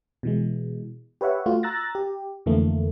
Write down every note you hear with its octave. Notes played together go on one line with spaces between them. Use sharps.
B2 E3 G#3
G4 B4 C#5 E5 F#5
A3 F4 F#4
A#5 E6 F#6 A6 A#6
G4
F2 D3 E3 A3 A#3